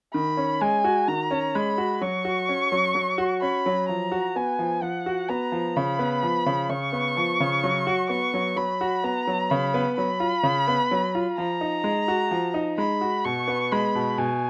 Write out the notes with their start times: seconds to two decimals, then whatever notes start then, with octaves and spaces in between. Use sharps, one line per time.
0.14 D#3 B5
0.37 C#4
0.61 G#3 G#5
0.84 F#4
1.08 D#3 A#5
1.31 C#4
1.54 G#3 B5
1.78 F#4
2.01 F#3 C#6
2.25 F#4
2.49 C#4
2.72 F#3
2.95 F#3
3.18 F#4
3.42 C#4 B5
3.66 F#3
3.89 F3 A#5
4.12 F#4
4.36 B3 G#5
4.59 F3
4.82 F3 F#5
5.06 F#4
5.29 B3 A#5
5.52 F3
5.76 C#3 B5
5.99 B3
6.23 F3
6.46 C#3
6.70 C#3 C#6
6.93 B3
7.17 F3
7.40 C#3
7.64 F#3
7.87 F#4
8.09 B3 C#6
8.34 F#3
8.56 F#3 B5
8.81 F#4
9.04 B3 A#5
9.27 F#3
9.50 C#3 B5
9.74 B3
9.97 F#3 B5
10.20 F4
10.43 C#3
10.68 B3
10.91 F#3
11.15 F4
11.37 F3 A#5
11.61 D#4
11.84 G#3
12.08 F#4
12.31 F3
12.54 D#4
12.78 G#3 B5
13.01 F#4
13.25 B2 C#6
13.48 B3
13.72 G#3 B5
13.95 B2
14.18 B2 G#5